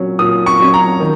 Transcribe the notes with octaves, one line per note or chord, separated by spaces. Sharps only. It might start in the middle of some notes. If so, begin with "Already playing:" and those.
Already playing: A#2 F#3 C#4
A#2 D#6
C#6
F#3 C#4
A#5
D#3